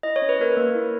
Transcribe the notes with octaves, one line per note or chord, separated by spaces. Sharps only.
E4 D#5
C#5
C#4
B4
A#3 A#4 C#5
A#3
E4